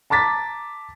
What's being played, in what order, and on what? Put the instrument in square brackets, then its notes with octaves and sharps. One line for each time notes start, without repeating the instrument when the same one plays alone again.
[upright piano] A5 A#5 D6 A6 B6